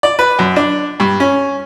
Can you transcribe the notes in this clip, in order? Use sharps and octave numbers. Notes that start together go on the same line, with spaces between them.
D5
B4
F#2
D4
G2
C#4